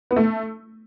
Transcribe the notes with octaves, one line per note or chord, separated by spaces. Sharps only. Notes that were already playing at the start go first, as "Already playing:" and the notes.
B3
A3